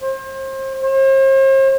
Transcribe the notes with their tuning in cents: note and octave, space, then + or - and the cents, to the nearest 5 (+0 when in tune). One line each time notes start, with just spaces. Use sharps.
C5 +35
C5 +45